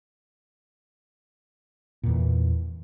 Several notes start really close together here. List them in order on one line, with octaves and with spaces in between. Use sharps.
A#2 E2 E3